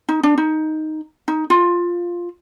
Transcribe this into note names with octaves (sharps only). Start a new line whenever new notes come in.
D#4
D4
D#4
D#4
F4